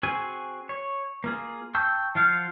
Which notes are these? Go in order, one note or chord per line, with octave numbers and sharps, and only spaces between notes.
C4 F#4 G#4 G#5
C#5
A#3 F4 G#4
G5 A5 C#6 E6 G6
F3 F4 F5 F#5 G6